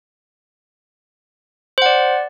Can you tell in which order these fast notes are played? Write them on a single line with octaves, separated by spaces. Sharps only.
C5 F#5 D5